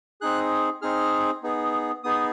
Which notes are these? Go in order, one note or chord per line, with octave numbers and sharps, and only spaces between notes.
C4 D#4 G#4 F#6
C4 D#4 G#4 F6
B3 D#4 G#4
B3 D#4 G#4 D#6